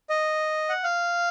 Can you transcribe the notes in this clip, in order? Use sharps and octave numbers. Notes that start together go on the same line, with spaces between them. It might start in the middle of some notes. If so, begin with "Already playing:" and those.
D#5
F#5
F5